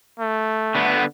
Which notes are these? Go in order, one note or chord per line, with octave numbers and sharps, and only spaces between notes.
A3
D3 B3